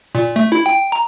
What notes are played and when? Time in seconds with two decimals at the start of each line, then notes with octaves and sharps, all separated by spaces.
0.15 A#2
0.36 A3
0.52 E4
0.66 G5
0.92 A#5